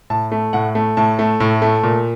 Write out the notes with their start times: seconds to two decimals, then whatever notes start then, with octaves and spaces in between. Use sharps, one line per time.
0.10 A2 A5
0.32 A3
0.53 A2 F#5
0.75 A3
0.97 A2 A5
1.19 A3
1.40 A2
1.62 A3
1.83 A#2